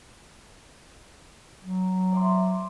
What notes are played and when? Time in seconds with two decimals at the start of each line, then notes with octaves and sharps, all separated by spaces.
1.63 F#3
2.12 D5 E5 C6